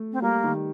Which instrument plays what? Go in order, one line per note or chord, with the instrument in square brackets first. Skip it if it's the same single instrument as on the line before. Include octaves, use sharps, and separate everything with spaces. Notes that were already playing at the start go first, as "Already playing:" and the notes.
Already playing: [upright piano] A3
[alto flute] C4
[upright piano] G3 [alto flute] A#3
[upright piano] D#3